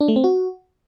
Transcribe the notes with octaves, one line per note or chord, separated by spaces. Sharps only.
D4
A3
C4
F#4